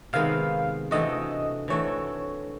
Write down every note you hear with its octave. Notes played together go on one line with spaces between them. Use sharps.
C3 D#3 G#3 B3 F5
C3 E3 A3 D4 F#4 D#5
C3 E3 A3 D4 F#4 C#5